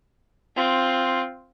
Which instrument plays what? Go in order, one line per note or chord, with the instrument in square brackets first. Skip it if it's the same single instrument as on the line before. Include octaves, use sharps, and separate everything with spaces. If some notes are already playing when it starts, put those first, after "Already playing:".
[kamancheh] C4 F4